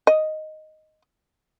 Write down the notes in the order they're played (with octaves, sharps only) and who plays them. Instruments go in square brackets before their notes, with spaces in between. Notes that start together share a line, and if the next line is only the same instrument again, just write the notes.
[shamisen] D#5